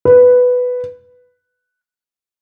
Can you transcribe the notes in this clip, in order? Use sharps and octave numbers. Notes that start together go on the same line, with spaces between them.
B4